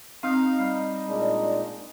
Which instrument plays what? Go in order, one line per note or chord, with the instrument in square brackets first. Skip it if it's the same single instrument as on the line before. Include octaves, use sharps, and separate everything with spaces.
[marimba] C4 [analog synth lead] D#4 [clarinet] F5
[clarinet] G3
[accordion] A#2 G#3 D4